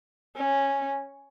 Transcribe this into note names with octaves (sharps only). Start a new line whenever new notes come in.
C#4